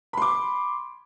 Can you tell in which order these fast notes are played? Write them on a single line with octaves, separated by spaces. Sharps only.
B5 C6 D6